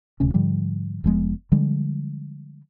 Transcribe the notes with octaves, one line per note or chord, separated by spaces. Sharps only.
D#1 D2 C3 C#4
G#2 D3 F3 G3
F1 F3 G#3 B3
D3 F3 G3 G#3